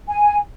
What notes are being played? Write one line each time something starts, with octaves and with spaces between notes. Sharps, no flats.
G#5